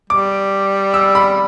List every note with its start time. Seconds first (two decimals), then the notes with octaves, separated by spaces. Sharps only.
0.10 G3 D6
0.94 E6
1.15 B5